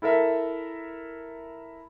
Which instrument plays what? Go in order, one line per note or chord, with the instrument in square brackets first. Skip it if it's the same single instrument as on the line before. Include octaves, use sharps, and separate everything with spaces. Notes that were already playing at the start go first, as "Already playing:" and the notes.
[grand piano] E4 A4 A#4 E5